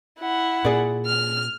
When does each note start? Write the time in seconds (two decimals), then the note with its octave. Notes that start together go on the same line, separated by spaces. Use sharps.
0.19 E4 F#5
0.65 A#2 G#4 D5
1.06 F6